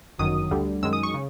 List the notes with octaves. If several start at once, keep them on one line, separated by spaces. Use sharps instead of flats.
G1 F#2 D#3 F#3 D#6
D2 D3 G3
F#2 D#3 G#3 E6
D#6
C#6
C#3